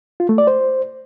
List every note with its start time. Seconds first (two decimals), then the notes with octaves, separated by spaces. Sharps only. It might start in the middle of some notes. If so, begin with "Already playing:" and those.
0.20 F4
0.29 A3
0.38 D5
0.47 C5